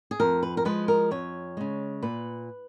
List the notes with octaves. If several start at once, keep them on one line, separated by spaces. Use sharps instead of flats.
G#4
F2 A#4
B4
A#4
F3 G#3 B4
A#4
F2 C#5
C#3 G#3
A#2 B4